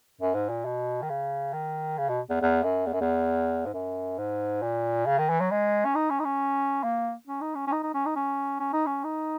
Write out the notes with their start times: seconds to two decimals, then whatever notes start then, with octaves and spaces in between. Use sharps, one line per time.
0.21 F#2
0.35 G#2
0.49 A#2
0.65 B2
1.02 D#3
1.10 C#3
1.53 D#3
1.98 C#3
2.09 B2
2.30 E2
2.42 E2
2.64 F#2
2.86 E2
2.93 F#2
3.01 E2
3.66 G#2
3.74 F#2
4.18 G#2
4.62 A#2
5.06 C#3
5.18 D#3
5.29 E3
5.40 F#3
5.51 G#3
5.85 C#4
5.95 D#4
6.10 C#4
6.20 D#4
6.25 C#4
6.83 A#3
7.27 C#4
7.41 D#4
7.55 C#4
7.67 C#4
7.72 D#4
7.83 D#4
7.94 C#4
8.06 D#4
8.16 C#4
8.60 C#4
8.73 D#4
8.86 C#4
9.04 D#4